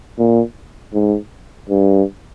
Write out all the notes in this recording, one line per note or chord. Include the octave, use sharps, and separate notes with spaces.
A#2
G#2
G2